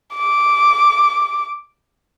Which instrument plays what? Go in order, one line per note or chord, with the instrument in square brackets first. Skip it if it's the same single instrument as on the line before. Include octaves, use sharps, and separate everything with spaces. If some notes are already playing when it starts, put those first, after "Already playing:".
[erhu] D6